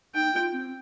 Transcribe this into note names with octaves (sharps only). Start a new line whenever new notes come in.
D#4 G5
F4
C4